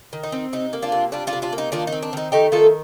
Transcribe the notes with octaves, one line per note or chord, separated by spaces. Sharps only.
D#3
D#4
C4
C3 D#4
A#3
D4 F4
C3
G3 D4 F4
D4 F4
C3
D4 F4
A#3
D#4
D#3 D4 F4
D#4
C4
D4
D#3 D#4
A3 D#4 G4
D#3 F4 A4